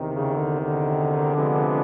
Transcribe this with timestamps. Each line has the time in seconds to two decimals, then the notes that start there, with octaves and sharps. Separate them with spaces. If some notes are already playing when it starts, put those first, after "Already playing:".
Already playing: E2 C3 D#3
0.11 C#3
0.36 D3
0.60 D3
1.35 C3 F3 G#3 B3 D4